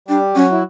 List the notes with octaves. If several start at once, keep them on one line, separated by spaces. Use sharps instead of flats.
G3 D4 G4
F#3 C#4 F#4
E4